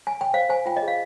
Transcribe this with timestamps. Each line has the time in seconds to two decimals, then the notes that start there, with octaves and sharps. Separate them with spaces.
0.07 G#5
0.21 G5
0.34 C5 F5
0.49 C5 G#5
0.66 F4 G5
0.77 D#5
0.82 G#4
0.88 F5